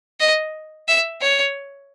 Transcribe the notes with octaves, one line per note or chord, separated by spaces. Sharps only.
D#5
E5
C#5